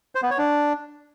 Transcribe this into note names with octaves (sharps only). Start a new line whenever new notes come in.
C5
B3
C#5
D4